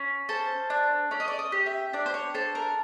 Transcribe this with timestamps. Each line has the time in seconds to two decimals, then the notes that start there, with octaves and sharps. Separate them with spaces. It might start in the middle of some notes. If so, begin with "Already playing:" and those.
Already playing: C#4
0.29 A4 C5
0.70 D4
1.11 C#4 D5
1.20 D#5
1.28 D5
1.39 D#5
1.52 G4
1.66 E5
1.93 D4 D5
2.06 C5
2.14 C#5
2.34 A4 C5
2.55 A#4